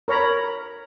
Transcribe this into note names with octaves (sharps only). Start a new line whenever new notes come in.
A#4 C#5 A#5 B5